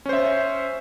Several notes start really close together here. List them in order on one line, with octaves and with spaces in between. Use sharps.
C#4 C5 E5